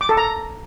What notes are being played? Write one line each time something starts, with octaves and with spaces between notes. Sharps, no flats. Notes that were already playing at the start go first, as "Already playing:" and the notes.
D6
A4
A#5